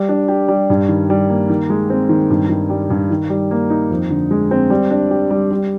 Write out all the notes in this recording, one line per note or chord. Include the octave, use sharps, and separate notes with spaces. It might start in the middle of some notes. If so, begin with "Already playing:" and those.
Already playing: G3
D4
G4
G3
G2
D#3
G3
A#3
D#3
G#3
C4
D#3
G2
D#3
G3
G2
D#3
G3
A#3
D#4
F2
D3
G#3
C4
G3
D4
G4
G3
G3